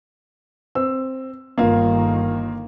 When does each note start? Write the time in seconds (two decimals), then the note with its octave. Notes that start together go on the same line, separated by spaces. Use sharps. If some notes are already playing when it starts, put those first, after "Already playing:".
0.75 C4 E6
1.58 G1 D#3 A#3 F4 F5